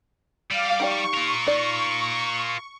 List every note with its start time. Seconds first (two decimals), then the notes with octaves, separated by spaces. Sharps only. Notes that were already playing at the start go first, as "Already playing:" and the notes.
0.51 G3 F5 D6
0.80 D#4 G4 D5 C#6
1.14 F4 A#4
1.46 D#4 D5